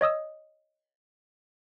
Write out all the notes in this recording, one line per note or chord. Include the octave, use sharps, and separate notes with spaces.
C#5 D#5 D#6 E6